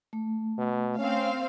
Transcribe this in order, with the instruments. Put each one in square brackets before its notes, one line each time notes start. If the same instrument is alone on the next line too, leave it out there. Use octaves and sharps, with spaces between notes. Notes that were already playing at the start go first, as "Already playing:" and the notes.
[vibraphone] A3
[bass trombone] B2
[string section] C4 F5 [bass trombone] C#4